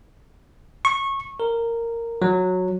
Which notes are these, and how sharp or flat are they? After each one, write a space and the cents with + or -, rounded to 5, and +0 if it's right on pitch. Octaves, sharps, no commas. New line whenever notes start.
C#6 -20
A#4 -10
F#3 -10